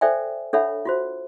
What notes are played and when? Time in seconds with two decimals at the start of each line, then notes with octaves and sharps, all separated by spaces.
0.01 A4 C5 D5 E5 G5 G#5
0.53 D4 A4 C#5 E5 F#5 B5
0.85 F4 F#4 C5